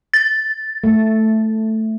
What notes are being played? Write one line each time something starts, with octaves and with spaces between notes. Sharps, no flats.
A6
A3